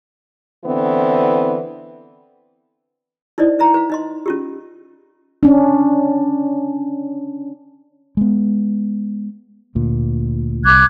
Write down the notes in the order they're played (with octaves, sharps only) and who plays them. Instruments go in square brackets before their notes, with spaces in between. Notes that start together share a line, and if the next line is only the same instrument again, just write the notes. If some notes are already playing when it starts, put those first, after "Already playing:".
[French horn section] D3 E3 B3 C4 E4
[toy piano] D#4 E4 C5 D5 D#5
B4 E5 A#5
B4 F5
D#4 D#5 C6
C#4 F4 G4
[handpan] C#4 D4
[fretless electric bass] G#3 B3
D2 A#2
[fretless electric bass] C2 [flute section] D6 F#6 G#6